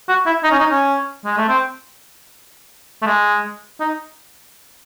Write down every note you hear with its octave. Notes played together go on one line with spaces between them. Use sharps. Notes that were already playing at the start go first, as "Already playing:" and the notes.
F#4
E4
D#4
C#4
D#4
C#4
G#3
A3
C4
A3
G#3
D#4